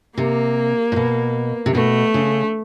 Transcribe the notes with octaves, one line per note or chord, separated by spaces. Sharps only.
C3 A#3
A#2
B2
C3
B2 A3
C#3